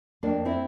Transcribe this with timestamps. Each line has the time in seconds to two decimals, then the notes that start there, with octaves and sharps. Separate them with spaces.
0.23 F2 A#3 D4
0.45 C4 E4